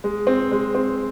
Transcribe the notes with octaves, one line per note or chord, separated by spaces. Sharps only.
G#3
C4
G#3
C4